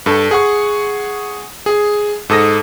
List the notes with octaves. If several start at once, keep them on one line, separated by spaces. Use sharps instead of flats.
G2 A4
G#4 F#5 C#6
G#4
G#2 A4 D#6 A#6